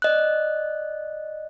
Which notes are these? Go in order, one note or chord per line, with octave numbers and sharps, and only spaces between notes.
D5 D#5 F#6